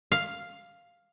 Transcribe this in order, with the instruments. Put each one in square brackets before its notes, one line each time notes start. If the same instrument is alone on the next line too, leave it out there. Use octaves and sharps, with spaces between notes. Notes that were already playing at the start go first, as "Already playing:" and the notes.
[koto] F5